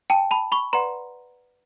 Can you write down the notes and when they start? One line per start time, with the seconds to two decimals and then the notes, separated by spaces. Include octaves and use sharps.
0.10 G5 A5
0.31 A5 B5
0.52 B5 C#6
0.73 B4 D5 F#5 A#5 C6